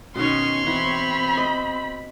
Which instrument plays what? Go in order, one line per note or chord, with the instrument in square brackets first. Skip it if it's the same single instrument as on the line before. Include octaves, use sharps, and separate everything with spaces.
[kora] B2 D#3 [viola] C#4 [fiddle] C#5 C6
[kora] E3 [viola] C4 B5
[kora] D#5